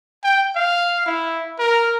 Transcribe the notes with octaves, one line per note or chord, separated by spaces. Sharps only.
G5
F5
E4
A#4